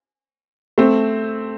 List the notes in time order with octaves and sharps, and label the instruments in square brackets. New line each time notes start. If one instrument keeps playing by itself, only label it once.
[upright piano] A3 C4